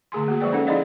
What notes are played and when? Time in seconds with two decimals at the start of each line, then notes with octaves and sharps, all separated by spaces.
0.12 D3 A3 G#4 G#5 C6
0.28 A#3 F#4 G#4
0.40 F3 G#3 B4 D5 G5
0.52 C#4 D#4 A4 F#5
0.67 D#4 E4 G#4 D5 D#5 F5